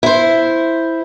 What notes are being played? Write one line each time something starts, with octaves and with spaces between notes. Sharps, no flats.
E4 C5